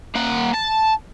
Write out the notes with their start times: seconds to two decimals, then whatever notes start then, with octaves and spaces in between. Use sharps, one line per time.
0.16 A#3 F#5
0.54 A5